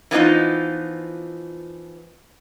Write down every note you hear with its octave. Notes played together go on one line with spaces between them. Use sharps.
E3 F3 B3 D#4 F4